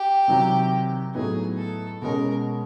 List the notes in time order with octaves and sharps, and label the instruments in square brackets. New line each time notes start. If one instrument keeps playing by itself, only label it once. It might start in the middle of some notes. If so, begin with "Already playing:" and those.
Already playing: [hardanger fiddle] G4
[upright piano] C3 D#3 F#3
[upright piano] A2 F#3 B3 D#4 [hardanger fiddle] G#4
[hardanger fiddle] A4
[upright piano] B2 G#3 C#4 [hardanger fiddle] A#4